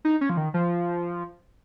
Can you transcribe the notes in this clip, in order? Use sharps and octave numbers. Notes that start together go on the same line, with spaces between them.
D#4
C#4
F3
D#3
F3